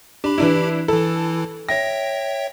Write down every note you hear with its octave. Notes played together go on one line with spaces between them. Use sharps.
D4 G4 B5
E3 D4 E4
E3 E4 A4
C#5 E5 G5 A#6